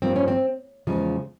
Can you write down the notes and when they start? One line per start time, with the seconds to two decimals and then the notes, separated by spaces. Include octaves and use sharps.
0.02 G2 F3 A#3 C4
0.16 C#4
0.28 C4
0.87 E2 C#3 F3 G#3